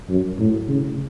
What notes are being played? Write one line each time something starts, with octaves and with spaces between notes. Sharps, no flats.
F#2
A2
C#3